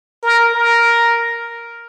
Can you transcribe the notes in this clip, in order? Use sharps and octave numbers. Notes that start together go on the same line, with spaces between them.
A#4
A#4